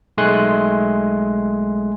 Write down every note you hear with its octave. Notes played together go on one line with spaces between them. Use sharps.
B1 G#3 A3 G#5 C6 F#6